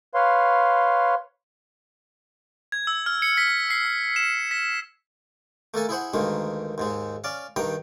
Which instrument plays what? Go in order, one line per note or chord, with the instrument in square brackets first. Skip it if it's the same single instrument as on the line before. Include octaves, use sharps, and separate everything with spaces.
[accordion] B4 C#5 F5 C6
[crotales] G#6
E6
F6
C#7
B6
C7
E7
B6
[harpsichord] A3 A#3 A4 G#5
E4 G#4 C5 F#5
D2 G2 D#3 G#3 A#3
D#2 G#2 G#3
C#4 D5 F5
G2 D#3 G3 G5 A#5